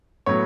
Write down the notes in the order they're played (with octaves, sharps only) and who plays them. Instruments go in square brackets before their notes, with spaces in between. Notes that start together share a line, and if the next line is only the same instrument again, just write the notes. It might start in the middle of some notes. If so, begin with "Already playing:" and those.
[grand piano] A2 F#3 B3 C#5